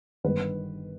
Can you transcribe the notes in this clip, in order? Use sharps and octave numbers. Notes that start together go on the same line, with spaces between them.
G1 G2 D#3 B4